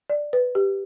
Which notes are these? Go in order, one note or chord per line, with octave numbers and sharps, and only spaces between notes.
D5
B4
G4